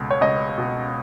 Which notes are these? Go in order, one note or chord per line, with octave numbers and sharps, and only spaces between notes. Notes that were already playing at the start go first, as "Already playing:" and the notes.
Already playing: C#2 B2
C#5
C#2 D#5
B2